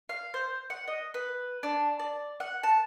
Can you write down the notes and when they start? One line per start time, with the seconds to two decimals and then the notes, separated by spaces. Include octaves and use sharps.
0.09 F5
0.34 C5
0.70 F#5
0.87 D#5
1.14 B4
1.63 D4
1.99 D5
2.40 F#5
2.63 A5